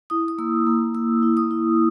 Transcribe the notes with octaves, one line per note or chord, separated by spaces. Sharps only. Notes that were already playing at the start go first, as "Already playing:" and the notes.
E4 D#6
D#6
A#3 E6
A#3
A#3 E6
E4
D#6
E4